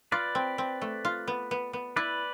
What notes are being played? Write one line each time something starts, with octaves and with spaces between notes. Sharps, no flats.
F4 B4 D5
C4
C4
A3
F4
B3
B3
B3
E4 B4 D5